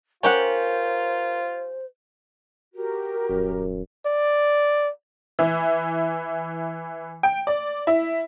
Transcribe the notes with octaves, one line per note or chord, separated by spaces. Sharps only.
C#4 F4 G4 A#4 C5 F#5 A5 A#5
F#4 G4 A#4
D#1 F#2
D5
E3
G5
D5
E4